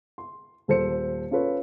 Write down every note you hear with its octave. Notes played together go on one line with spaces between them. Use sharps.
C6
D#1 A4 C5 C#7
C#4 F4 A4 B4 C#5